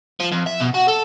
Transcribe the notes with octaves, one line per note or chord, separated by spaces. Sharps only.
F3
F2
E5
B2
F#4
A4